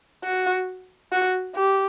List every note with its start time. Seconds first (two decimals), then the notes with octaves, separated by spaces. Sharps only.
0.24 F#4
1.12 F#4
1.56 G4